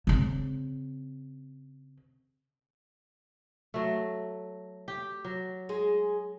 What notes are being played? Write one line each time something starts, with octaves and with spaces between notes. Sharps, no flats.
C#3 C4
F#3 A3
G4
F#3
G#3 G#4